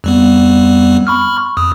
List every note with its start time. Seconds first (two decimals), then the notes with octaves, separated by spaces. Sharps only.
0.04 F2 G3 B3
1.07 B5 C#6 F6
1.57 F2 D#6